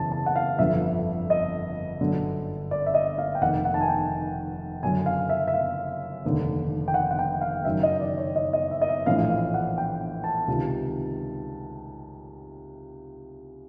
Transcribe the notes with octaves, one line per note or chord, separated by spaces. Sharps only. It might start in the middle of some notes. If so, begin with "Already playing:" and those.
Already playing: F#1 E2 C#3 E3 A5
A5
F#5
F5
G1 F2 D3 E5
D#5
G1 F#2 D3
D5
E5
D#5
F5
G5
F1 D#2 D#3 F#5
F#5
A5
G#5
G5
F#1 F#2 D3 G#5
F5
E5
E5
F5
F1 D#2 D3
G5
F#5
F#5
G5
F5
F#1 F#2 D#3 E5
D#5
D5
C#5
D#5
D#5
E5
D#5
E5
A#1 A2 E3 F5
F5
F#5
G5
A5
C#2 C3 D#3